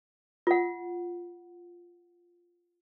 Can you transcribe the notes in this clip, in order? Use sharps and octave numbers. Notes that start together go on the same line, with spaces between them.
F4 F#5